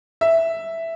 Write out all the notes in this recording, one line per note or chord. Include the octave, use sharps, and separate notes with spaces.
E5